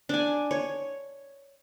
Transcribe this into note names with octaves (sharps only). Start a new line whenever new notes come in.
D4 G#5
C#5